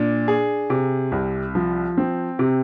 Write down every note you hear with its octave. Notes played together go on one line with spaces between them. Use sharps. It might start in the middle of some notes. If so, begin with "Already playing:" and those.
Already playing: A#2 D4
G#4
C3
C2
F3
C4
C3